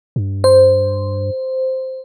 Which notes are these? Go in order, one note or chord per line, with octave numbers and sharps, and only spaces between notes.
G2
C5